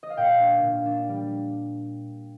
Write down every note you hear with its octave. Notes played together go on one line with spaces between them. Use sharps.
D#5
F5
A#2 G5
D4
A#2
D4
G3